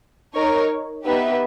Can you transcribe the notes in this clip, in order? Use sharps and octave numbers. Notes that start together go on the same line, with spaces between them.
D#4 A#4 C#5
B3 D#4 G4 B4 E5